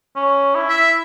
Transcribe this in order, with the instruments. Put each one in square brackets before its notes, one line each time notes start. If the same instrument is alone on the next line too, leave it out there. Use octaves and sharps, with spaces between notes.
[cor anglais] C#4
E4
[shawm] E5